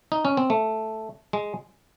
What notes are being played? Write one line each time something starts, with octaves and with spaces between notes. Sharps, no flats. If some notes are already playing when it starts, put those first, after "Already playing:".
D#4
C#4
C4
A3
G#3